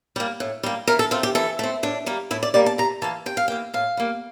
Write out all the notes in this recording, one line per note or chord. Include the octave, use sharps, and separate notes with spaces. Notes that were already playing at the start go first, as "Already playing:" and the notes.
G3 A#3
A2
G3 A#3
E3 A#4
A4
A3 C4 F4
G4
E3 A4
A3 C4
A2 D4
G3 A#3
A2 E4
D5
G3 A#3 D5
A5
C3 A#5
E3 A#3 A5
C3 G5
F5
E3 A#3 G5
A2 F5
G3 A#3